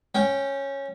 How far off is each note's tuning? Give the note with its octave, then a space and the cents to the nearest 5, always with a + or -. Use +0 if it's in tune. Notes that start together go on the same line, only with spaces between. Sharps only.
C#4 -10 G5 +0